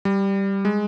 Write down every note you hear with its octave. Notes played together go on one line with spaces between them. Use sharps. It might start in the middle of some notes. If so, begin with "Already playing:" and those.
G3
G#3